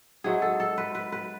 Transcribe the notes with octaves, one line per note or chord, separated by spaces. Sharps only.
G#2 F#3 A3 G#4
A4
A4
B4
B4
B4